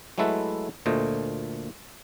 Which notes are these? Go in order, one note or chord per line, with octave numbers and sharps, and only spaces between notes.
F#3 G#3 A3 E4 A4 B4
D2 A#2 A3 C5 D#5